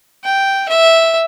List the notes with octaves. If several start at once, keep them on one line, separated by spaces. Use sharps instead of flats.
G5
E5